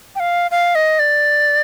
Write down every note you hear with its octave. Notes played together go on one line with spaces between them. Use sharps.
G5
F5
F5
D#5
D5